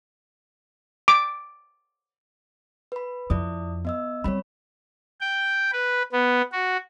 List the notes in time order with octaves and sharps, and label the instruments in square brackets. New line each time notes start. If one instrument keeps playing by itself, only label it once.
[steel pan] D6
[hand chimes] B4 B5
[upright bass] F2 [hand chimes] E4 D5 D#6
[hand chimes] B3 D#5 E6
[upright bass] G3 C4 [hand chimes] C#5 B5
[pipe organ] G5
B4
B3
F#4